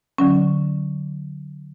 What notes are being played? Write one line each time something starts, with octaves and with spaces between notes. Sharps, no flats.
D3 F#3 C#4